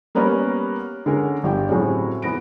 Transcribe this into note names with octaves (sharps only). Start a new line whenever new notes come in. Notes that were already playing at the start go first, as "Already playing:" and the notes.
G3 A#3 B3 C#4 A#4
D3 G#3 C#4 A#4
G1 G4 G5
A2 F#3 G#3 C4 C#4
E3 B3 A#6 D7